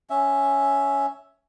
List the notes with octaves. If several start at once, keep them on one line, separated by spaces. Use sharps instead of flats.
C#4 E5